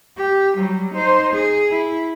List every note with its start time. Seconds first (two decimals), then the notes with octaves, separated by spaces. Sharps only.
0.18 G4
0.57 F#3 G3
0.95 D#4 C5
1.35 G#4
1.72 E4